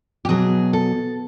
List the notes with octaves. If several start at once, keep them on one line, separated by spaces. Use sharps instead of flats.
G4
B2 F#3 G#4
A4